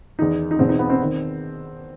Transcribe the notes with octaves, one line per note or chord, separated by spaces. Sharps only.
E2 D#3 D#4
D#4
E2 B2 C4
D#4
B3
C4
D#3